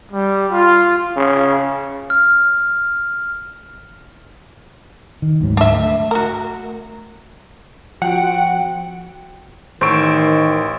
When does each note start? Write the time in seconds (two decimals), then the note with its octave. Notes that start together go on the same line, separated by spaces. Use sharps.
0.11 G3
0.52 F4
1.16 C#3
2.10 F6
5.22 D#3
5.41 D2 G#2 F#3
5.57 D4 E5
5.75 A3
6.11 F#4 A#4
8.02 F3 C4 F4 F#4 F#5 G5
9.81 A1 D#3 C5 C#6 E6 D7